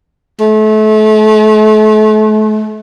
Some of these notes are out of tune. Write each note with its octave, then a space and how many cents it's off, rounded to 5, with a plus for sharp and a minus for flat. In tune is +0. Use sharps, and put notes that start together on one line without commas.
A3 -35